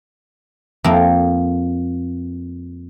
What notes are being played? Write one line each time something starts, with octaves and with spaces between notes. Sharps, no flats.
F2 A#3 A#5